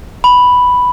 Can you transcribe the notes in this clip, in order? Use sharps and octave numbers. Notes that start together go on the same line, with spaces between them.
B5